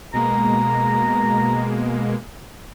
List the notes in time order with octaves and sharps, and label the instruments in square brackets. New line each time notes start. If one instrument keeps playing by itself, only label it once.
[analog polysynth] B2 G#3 A#3 [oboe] A#5